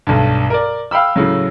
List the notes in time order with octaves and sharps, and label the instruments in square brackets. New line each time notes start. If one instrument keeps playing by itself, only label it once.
[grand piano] B1 G2
A#4 D5
F5 G5 B5 E6
A2 C#3 F#3